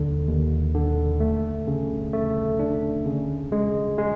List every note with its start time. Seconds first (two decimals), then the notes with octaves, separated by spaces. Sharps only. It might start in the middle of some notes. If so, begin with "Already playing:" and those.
Already playing: D#2 D3
0.28 D#2
0.74 D3
1.20 A3
1.67 C#3
2.13 A3
2.59 D4
3.06 C#3
3.52 G#3
3.98 G#3